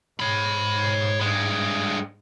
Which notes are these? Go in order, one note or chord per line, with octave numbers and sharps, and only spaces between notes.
G#2 C#5 B5
G2 G#3